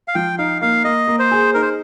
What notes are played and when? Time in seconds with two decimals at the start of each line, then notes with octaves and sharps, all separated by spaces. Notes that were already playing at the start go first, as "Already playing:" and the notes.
0.08 F5
0.15 F3 G5
0.38 D#4 F5
0.61 A#3 F5
0.84 A#3 D#5
1.08 A#3
1.19 C5
1.31 G#4
1.54 D#4 A#4
1.62 C5